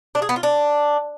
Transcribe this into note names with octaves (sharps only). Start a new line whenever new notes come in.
D4
G#4
B3
F4
D4